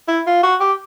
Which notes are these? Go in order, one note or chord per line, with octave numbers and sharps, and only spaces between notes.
E4
F4
F#4
G4